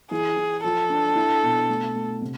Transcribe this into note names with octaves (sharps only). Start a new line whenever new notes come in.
E3 G#4
E3
F3 A4
D4
E4
B2
A3
A3
C3